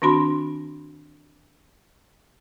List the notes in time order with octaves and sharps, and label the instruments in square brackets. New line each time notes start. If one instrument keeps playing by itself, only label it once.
[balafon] D#3 C4 D4 F#4 B5 C6